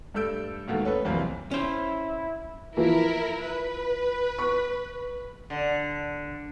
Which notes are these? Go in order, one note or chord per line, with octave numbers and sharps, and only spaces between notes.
G2 A3 A4 E6 G6 D7
D#2 G#2 B2 A3 A#3
A3 C#4 A4 B4
C2 F2 E3 F#3 A#3 C4
C#4 E4 C5
E3 F3 A#3 E4 A#4
B4
C#6
D3